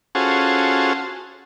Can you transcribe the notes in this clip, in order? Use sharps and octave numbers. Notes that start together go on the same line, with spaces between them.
C#4 F4 F#4 G#4 A4 C5